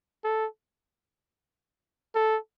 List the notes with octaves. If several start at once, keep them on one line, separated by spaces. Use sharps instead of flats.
A4
A4